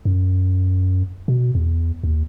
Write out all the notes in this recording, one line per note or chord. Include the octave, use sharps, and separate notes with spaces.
F#2
B2
E2
D#2